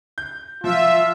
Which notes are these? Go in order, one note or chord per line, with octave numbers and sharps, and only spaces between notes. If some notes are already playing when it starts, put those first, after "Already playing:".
G6
F3 F4 E5